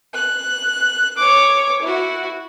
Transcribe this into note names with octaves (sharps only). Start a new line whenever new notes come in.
F#6
C#5 D6
E4 F#4